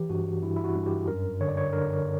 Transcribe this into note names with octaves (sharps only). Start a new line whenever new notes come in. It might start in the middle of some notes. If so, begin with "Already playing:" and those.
Already playing: E3 G4
G2 F#4
G2 E4
E4
F#4
G2
G4
F#2 A#4
D3 C#5
D5
C#5
D3 A#4